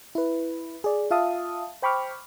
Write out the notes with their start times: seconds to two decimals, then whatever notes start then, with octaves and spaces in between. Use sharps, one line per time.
0.15 E4 B4
0.84 G#4 D5
1.11 F4 E5 F5 A5 D#6
1.82 C5 G5 B5 C#6 D6 F6